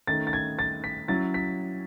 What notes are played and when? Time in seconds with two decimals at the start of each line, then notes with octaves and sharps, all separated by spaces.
0.07 D#3 A3 C#4 A6
0.27 A6
0.33 G#6
0.59 A6
0.84 B6
1.08 F#3 C#4 E4 A6
1.34 B6